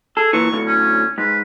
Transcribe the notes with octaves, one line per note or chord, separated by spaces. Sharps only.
G#4 A4
A#2 E3 C#6
D2 A2
C#4
G#2 B4